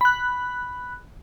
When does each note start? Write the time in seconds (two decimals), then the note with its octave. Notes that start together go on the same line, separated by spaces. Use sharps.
0.01 B5 F#6